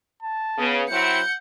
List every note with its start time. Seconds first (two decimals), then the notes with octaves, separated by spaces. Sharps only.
0.22 A5
0.58 C#3 B3
0.90 F#3 C4 E4 F#5 G6 C#7